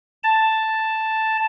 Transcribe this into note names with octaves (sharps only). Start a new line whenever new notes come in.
A5